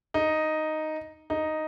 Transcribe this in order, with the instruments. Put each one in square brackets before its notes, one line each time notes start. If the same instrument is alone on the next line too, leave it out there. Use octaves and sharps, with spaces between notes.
[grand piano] D#4
D#4